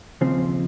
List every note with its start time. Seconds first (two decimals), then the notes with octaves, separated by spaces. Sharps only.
0.21 D#2 C#3 F3 C4